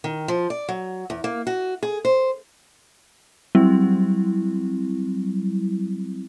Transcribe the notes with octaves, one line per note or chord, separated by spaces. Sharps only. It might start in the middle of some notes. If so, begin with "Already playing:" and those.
D#3
F3
D5
F#3
E2
A#3
F#4
G#4
C5
F#3 G3 C4 E4